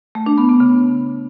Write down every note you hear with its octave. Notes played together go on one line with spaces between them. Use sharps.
A3
D4
B3
B3
C#3